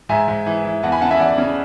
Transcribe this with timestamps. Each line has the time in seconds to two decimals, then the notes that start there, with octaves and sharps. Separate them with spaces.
0.09 G#2 E5 G#5
0.28 G#2
0.46 E3
0.65 E3
0.83 E2 F#5 A5
0.92 G#5 B5
1.01 C#3 F#5 A5
1.11 E5 G#5
1.20 E2 D5 F#5
1.38 C#3